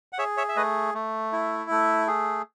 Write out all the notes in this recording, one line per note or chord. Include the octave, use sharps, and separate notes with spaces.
F#5
G#4 C#5 E5
C#5 E5
E5
A3 B4 D#5
A3
E4
A3
G#4